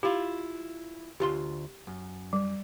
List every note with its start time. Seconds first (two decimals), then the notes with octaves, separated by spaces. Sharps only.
0.03 E4 F4 G4
1.20 D2 F4 G4 C6
1.87 F#2
2.33 G3